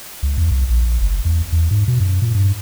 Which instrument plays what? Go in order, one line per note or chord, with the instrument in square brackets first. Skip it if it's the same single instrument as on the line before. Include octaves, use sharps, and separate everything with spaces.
[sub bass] C#2
E2
C2
A#1
F#1
E2
E2
G#2
B2
F#2
A#2
G2